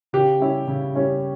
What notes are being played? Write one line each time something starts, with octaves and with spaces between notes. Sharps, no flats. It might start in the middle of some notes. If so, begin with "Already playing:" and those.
C#3 G4
G3 C#4 E4
C#3
G3 C#4 E4